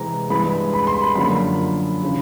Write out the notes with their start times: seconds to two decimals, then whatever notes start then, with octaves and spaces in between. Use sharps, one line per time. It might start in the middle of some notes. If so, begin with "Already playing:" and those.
Already playing: C3 E3 G#3 C4 A#5
0.30 G2 E3 G#3 B3 B5
0.74 B5
0.87 C6
1.01 B5
1.16 F#2 D3 F3 A#3 B5
2.03 C#3 E3